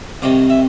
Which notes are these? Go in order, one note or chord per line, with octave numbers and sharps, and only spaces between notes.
C2 C3 D#3 D5
E5